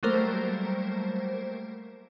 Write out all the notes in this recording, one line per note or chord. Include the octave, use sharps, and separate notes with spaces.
F#3 G3 A3 A#3 A#4 C5